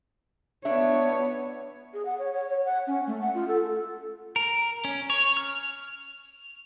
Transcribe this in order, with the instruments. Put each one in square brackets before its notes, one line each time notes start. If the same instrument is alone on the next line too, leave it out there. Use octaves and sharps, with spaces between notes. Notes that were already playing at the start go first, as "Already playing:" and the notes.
[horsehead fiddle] B3 C#5 [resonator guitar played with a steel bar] D4 E5
[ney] G#4
F#5
C#5
C#5
C#5
F#5
C#4
A3
F#5
F4
A4
[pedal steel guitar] A#4
C#4
C#5
F6